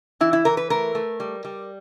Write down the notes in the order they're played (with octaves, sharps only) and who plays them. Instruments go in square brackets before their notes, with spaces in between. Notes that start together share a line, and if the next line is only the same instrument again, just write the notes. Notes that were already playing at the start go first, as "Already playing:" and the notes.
[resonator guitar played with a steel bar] E3 E4
E4
E3 A#4
B4
A3 A#4
A3
G3
G3